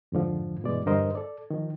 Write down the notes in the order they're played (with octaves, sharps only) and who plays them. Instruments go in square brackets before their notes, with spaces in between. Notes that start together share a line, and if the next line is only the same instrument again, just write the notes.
[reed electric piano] F2 G#2 D3 F3
G2 B2 E3 G#3 D5
E2 G2 D3 A#4 C5 D#5
A4 D5
D#3 F3